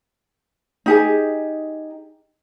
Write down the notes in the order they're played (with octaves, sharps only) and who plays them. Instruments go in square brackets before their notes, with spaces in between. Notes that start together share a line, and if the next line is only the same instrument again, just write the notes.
[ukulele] D#4 G4 G#4